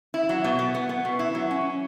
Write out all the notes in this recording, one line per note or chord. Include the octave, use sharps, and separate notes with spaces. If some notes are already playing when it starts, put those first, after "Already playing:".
E4
F#3
B2
B3
B3
B3
B2
E4
F#3
C#4